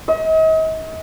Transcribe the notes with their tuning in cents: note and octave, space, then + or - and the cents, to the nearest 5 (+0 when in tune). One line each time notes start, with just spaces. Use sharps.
D#5 +40